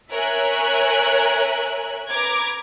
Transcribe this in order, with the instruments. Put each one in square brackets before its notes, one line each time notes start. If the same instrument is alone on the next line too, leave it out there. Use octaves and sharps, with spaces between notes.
[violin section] A#4 C#5 E5 G#5 F#6
B4 A#5 D6 G#6